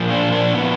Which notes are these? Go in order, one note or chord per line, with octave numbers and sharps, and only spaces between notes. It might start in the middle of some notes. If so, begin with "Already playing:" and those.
Already playing: A#2 F3
D4
D4
B3